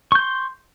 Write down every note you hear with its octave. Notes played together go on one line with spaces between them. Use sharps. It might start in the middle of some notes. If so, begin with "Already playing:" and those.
C6 C#6 G6